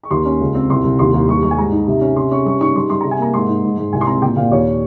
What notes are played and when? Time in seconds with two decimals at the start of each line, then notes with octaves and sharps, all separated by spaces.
0.03 C#6
0.11 D#2 C6
0.25 C#4
0.40 C#2
0.55 C4
0.69 C2 C6
0.84 C2
0.99 D#2 C6
1.14 D#2
1.28 G2 C#6
1.43 G2 C#6
1.51 G#5
1.58 G#2 A#5
1.72 D#4
1.87 C3
2.01 C#4
2.16 C3 C6
2.31 C#4 C#6
2.46 G2 C#6
2.61 D#4 C#6
2.75 G2 C6
2.90 G2 C6
3.01 C3 A#5
3.11 G#5
3.19 A#3 A#5
3.34 G#2 C6
3.48 D#4
3.64 G#2
3.78 G#2
3.93 C2 G#5
4.01 C6
4.07 C4 A#5
4.22 A#2 G5
4.36 A#2 F5
4.51 D#2 C#5